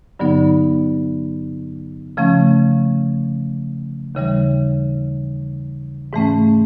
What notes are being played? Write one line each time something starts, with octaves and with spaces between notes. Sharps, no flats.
G2 D3 F#3 B3 D#4
C#3 F3 A3 C#4
D#2 C#3 E3 G3
G#2 E3 A3 C#4